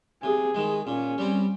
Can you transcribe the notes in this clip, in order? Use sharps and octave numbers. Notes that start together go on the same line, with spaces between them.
C3 G#4
D#3 G#3
A#2 C#4
G3 C4